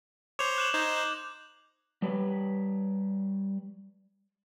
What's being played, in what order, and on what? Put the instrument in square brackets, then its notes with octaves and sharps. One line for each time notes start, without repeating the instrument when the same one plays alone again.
[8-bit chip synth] C5 C#5 [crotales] D6 F7
[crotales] F#6 E7 F#7
[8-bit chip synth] D#4 C5 [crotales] G6 G#6
[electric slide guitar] G3 B4 C#5